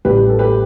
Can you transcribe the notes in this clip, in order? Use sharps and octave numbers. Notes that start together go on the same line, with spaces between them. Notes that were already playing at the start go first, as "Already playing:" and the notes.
A1 A2 G3 G4 B4
A4
G4 B4